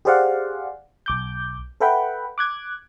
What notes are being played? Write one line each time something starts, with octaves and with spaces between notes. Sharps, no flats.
G4 G#4 C5 D5 F5 F#5
B1 D6 G6
A4 B4 E5 F#5 G5 B5
D6 F#6 G#6